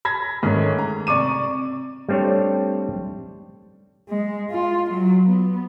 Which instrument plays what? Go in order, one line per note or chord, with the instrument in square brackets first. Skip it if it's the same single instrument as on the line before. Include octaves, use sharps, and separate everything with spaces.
[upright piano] B5 G#6 A#6 B6
G#2 D#3 A3 C#4
A#5
C3 D5 C#6 D6 D#7
[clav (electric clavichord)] G3 A3 C4 D4 C#5
[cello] G#3
F4
F#3
B3